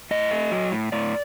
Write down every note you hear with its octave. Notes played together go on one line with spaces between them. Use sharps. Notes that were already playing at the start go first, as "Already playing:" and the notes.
A2 D#5
A3
F#3
A2
A2 D5